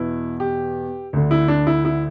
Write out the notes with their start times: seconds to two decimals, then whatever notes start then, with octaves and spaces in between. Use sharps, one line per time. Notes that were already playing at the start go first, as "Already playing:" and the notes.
Already playing: E2 B2 E4
0.40 G4
1.13 D2 D3
1.31 E4
1.48 D4
1.67 E4
1.85 E4